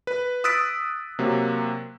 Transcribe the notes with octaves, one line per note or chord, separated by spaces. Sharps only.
B4
D#6 E6 F#6 A6 B6 D7
C3 F#3 A#3